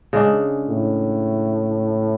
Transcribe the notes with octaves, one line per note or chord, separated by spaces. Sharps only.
C#3 G#3 D4
A2